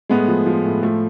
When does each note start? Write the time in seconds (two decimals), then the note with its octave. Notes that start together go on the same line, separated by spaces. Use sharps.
0.09 A2 G#3 B3
0.28 F3
0.46 F3
0.64 A2
0.82 F3 A3